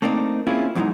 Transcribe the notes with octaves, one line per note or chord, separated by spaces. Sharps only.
A3 A#3 C4 D4 D#4
A#3 C4 C#4 E4 F4 G#4
E2 G#2 E3 F#3 G#3 D#4